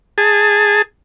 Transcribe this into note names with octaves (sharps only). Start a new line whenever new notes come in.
G#4 A5